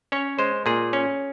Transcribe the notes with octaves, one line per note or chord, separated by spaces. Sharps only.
C#4 C#5
G#3 C5
A#2 G#4
C#4